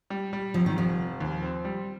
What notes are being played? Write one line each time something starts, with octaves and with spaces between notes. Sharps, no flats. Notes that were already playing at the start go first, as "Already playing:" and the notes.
G3
G3
F1 F3
D#3
F1 F3
F1
D#2
C4
G3